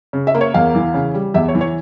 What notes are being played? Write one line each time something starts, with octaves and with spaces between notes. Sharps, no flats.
C#3
E5
A#3
C#5
E2 F5
E3
C#3
G3
E2 E5
C#5
E3
C#5